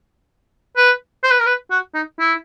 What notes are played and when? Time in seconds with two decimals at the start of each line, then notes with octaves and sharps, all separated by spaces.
0.77 B4
1.23 C5
1.31 B4
1.39 A#4
1.46 B4
1.71 F#4
1.94 D#4
2.19 E4